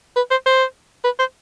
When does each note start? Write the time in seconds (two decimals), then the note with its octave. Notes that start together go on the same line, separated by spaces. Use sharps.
0.16 B4
0.31 C5
0.46 C5
1.04 B4
1.19 C5